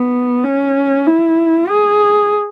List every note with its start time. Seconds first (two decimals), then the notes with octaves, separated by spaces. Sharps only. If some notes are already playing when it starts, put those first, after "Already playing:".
Already playing: B3
0.44 C#4
1.06 E4
1.69 G#4